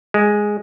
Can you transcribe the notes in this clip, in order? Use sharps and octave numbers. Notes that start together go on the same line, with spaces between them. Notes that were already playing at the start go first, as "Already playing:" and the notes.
G#3